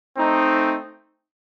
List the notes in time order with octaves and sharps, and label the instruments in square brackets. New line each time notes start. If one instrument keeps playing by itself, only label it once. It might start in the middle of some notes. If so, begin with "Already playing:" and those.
[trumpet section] A3 C4 D#4